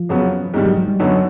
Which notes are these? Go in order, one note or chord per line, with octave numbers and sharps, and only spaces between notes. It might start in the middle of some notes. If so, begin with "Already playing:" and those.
Already playing: F3
F2 C#3 F#3 B3
G#2 D#3 G3
F#3
F#3
G3
F#2 D3 F#3 B3 D#4